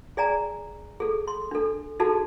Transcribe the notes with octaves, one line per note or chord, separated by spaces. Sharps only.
G#4 D5 G#5 A#5
G#4 A4
C6
D4 A4
D#4 F#4 G#4 A4 A5